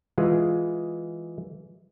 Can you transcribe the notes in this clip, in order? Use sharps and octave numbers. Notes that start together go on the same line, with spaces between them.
E3 G#3 F4 G#4